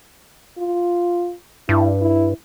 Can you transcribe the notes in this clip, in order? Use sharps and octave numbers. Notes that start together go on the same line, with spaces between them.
F4
G2 E4
E4